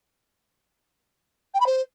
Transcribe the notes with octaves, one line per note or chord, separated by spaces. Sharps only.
G5
B5
C5